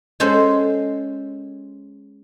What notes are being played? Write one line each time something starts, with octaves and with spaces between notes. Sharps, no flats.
G#3 C#4 A4 C5